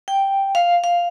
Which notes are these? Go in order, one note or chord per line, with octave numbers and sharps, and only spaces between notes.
G5
F5
F5